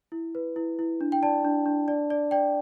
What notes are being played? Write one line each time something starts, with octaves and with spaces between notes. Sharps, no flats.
E4
B4
E4
E4
D4
G5
D5 A5
D4
D4
D5
D5
D5 G5